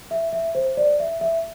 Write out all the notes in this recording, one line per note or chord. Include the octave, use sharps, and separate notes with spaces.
E5
E5
C5
D5
E5
E5